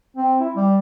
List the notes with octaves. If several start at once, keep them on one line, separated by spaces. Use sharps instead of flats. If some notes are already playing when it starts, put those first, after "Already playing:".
C4
E4
G3